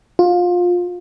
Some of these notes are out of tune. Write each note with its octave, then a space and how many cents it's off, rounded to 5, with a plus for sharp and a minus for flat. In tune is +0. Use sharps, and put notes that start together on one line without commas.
F4 +20